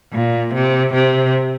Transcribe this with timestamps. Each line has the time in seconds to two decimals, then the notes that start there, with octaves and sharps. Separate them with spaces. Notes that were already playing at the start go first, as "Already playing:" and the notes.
0.13 A#2
0.54 C3
0.94 C3